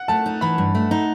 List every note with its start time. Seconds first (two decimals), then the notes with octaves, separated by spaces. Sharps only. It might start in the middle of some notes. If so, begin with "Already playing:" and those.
Already playing: F#5
0.08 A3 A5
0.26 D#4
0.41 E3 B5
0.58 G2
0.75 A3
0.91 D#4